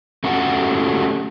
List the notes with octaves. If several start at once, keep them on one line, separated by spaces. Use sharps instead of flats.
A3 C#4 F#4 G4 A4 F#5